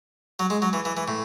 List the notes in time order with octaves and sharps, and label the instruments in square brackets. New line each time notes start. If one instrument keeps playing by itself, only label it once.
[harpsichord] F#3
G#3
F#3
E3
E3
E3
A2